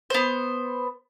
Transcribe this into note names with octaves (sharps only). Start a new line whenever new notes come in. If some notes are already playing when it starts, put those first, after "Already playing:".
B3 C5